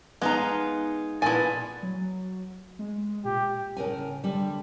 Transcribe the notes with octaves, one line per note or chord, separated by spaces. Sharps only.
G#3 B3 D#4 F5 A#5
A#2 B3 E4 G#5 A5
F#3
G#3
A#2 G4
A2 C#3 A#4 G#5
D3 G3